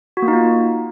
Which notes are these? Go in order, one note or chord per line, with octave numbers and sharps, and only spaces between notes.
F#4
A#3
D#4
F4